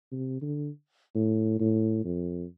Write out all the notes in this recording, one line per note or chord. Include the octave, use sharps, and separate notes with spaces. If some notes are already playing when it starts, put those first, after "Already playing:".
C3
D3
A2
A2
F2